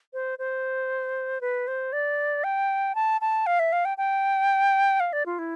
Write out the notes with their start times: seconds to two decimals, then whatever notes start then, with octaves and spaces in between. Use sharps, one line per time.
0.14 C5
0.39 C5
1.41 B4
1.68 C5
1.93 D5
2.44 G5
2.95 A5
3.21 A5
3.46 F5
3.59 E5
3.73 F5
3.85 G5
3.98 G5
5.00 F5
5.13 D5
5.26 F4
5.39 E4